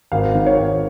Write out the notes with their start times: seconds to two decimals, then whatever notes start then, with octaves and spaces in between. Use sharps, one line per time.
0.12 G#1 F5
0.35 D#3
0.46 C#5
0.59 G#1